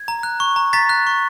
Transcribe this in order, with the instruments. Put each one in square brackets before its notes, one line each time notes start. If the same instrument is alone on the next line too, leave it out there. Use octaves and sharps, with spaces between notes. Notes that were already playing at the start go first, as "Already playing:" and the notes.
Already playing: [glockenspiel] G#6
A#5
F#6
C#6
A#5
A#5 A6 B6
F#6
C#6